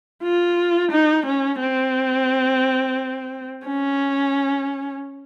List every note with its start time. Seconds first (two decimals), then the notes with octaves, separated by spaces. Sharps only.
0.23 F4
0.92 D#4
1.26 C#4
1.60 C4
3.67 C#4